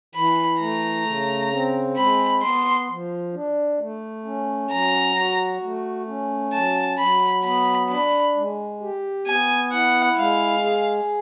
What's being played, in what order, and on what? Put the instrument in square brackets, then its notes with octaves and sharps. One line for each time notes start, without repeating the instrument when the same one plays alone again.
[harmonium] E3 [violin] B5
[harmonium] A3 [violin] A#5
[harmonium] C#3
C4
[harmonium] G#3 [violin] B5
[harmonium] B3 [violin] C6
[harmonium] F3
D4
A3
C#4
[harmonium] F#3 [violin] A#5
[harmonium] F#4
A3
C#4
[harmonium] F#3 [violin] A5
[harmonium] F#3 [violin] B5
[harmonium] B3 [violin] B5
[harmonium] D4 [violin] B5
[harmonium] G#3
G4
[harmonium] B3 [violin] G#5
[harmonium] E4 [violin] F#5
[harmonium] G#3 [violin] F5
[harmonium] G#4